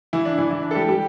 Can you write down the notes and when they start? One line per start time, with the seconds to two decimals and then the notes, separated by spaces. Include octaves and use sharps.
0.13 E3 E4
0.25 D4
0.38 E3 E4
0.51 E3 E4
0.63 D4
0.71 A4
0.75 G3 G4
0.88 G3 G4